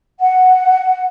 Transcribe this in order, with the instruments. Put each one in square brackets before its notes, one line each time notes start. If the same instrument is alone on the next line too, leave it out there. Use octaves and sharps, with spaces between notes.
[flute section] F#5